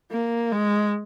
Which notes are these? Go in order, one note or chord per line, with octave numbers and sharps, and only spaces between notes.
A#3
G#3